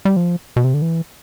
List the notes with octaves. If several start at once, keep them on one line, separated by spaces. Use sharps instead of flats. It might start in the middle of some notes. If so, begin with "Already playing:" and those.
G3
F3
B2
C3
D3
E3